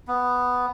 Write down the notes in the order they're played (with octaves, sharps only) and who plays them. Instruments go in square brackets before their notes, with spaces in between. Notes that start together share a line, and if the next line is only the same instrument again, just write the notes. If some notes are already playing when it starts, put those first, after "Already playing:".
[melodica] B3